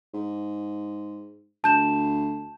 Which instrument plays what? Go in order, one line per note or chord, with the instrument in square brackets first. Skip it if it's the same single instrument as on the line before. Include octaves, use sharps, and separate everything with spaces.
[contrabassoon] G#2
[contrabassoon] D2 [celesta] A5 G6 E7